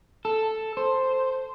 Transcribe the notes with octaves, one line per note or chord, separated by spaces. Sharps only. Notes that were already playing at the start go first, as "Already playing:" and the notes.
A4
C5